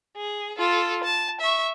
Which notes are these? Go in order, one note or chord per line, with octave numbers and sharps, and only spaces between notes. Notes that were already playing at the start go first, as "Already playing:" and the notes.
G#4
F4 A4
A5
E5 C#6